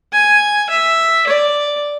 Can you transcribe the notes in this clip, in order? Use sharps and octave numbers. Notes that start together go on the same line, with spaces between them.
G#5
E5
D5